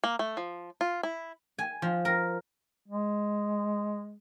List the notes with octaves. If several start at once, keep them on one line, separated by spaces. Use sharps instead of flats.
A#3
A3
F3
F4
E4
G#5
F3
A#4
G#3